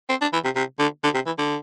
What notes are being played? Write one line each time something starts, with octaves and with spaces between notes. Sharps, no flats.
C4
D4
E3
C3
C3
D3
D3
C3
E3
D3